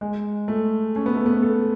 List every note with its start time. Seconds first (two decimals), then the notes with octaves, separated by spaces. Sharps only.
0.01 G#3
0.48 A3
0.96 C#4
1.06 B3
1.15 A3
1.26 B3
1.42 A4